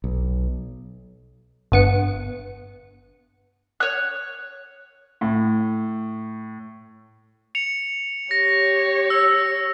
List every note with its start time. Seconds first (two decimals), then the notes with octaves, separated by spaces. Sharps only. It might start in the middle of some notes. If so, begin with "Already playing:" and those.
0.04 B1
1.72 G1 B3 C#7
3.80 C#5 F#6
5.21 A2
7.55 C#7 F7
8.31 G4 C#5 A#6
9.10 E6